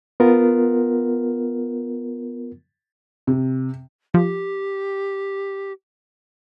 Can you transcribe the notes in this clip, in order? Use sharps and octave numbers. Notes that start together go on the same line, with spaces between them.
B3 F4 A#4
C3
F3 G4